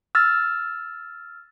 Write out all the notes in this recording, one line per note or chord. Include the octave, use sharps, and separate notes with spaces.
E6 F6 A6